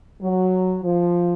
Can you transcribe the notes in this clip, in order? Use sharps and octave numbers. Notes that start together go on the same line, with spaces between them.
F#3
F3